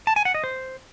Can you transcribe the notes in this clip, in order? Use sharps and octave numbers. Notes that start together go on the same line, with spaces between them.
A5
G#5
F#5
D#5
C5